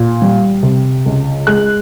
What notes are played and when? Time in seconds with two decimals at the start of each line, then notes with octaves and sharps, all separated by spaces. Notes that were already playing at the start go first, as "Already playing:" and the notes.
Already playing: A#2
0.22 G3
0.63 C3
1.06 C#2
1.47 G#3 F#6